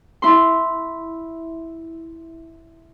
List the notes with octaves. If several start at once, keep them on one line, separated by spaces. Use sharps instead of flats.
E4 C6